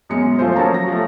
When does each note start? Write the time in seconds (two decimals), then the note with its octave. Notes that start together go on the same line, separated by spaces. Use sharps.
0.09 F#2 B2 G#3 C#7
0.39 F3 A3 F4 C5
0.56 F3 F#3 A#3 C#4 A5 A#5
0.74 A#6
0.88 F3 F#3 A3